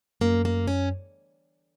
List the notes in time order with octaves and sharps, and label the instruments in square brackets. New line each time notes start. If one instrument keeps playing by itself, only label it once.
[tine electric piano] F#2 [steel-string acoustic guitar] A#3
[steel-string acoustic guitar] A#3
C#4